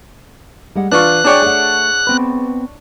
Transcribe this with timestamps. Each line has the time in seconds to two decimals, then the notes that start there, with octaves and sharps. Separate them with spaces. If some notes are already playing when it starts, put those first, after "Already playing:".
0.75 G3 G#3 F#5
0.92 E3 D4 F4 C#6 F#6
1.24 F#3 D4 G#4 C#5 D5 G5
1.42 A3 G#4 F#5
2.07 B3 C4 B4